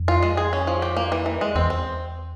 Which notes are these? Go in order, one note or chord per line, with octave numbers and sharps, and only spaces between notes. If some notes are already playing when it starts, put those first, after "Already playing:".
Already playing: F2
F4
G#3
G#4
C#4
F3
G4
A#3
E3
E3
G#3
E2 C4
C4